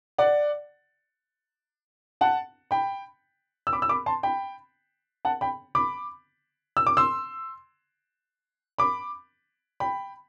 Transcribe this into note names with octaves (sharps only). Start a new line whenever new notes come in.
D5 F#5
F#5 A5
G5 B5
E6
B5 D6
E6
B5 D6
A5 C6
G5 B5
F#5 A5
G5 B5
B5 D6
E6
D6
C6 E6
B5 D6
G5 B5